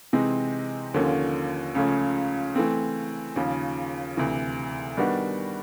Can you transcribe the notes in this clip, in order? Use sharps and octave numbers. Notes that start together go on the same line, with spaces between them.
C3 E3 G#3 C4 D#4
D#2 D3 F3 A#3 C#4
C#2 C#3 F3 A3 C#4
E3 A3 C4
D#2 C#3 F3
D2 C3 E3
D#3 G3 B3 D4 F#4